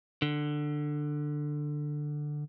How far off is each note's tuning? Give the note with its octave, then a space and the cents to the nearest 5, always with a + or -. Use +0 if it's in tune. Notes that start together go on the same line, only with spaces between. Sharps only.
D3 +15